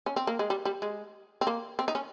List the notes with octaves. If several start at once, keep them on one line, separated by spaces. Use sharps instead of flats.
C#4
C4
A#3
G#3
G3
G3
G#3
C4
A#3
C4
D#4
C#4